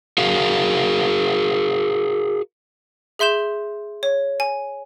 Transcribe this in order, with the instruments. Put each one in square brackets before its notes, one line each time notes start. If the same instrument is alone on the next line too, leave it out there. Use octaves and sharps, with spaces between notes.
[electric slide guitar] F#4 G#4 A#4 F5
[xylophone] G#4 E5 C6 G6 E7
C#5
G#5